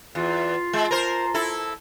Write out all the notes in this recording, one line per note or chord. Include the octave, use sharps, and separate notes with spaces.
E2 F4
G#3
A#4 C5
E4 A4